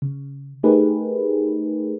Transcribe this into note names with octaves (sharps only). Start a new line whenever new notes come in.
C#3
A3 D#4 G4 G#4 A#4 B4